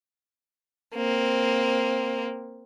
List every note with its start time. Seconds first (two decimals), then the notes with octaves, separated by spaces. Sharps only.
0.95 A#3 C4